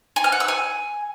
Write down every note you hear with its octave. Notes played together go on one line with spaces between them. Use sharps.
G#5
F6
F#5
E6
G#5